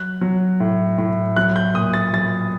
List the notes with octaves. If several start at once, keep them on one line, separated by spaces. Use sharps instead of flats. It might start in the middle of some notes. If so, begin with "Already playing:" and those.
Already playing: F#3 F#6
F#3
A2
A2
F#3 F#6
G6
A#2 D#6
A6
F#3 A6